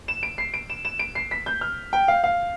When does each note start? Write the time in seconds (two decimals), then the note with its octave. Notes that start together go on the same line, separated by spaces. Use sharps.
0.08 E7
0.23 D7
0.38 C7
0.54 D7
0.70 E7
0.85 E7
0.99 D7
1.15 C7
1.31 B6
1.46 G6
1.61 F6
1.93 G5
2.08 F5
2.24 F5